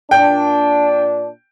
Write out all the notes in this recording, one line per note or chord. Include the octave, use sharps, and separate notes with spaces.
A#2 D4 G5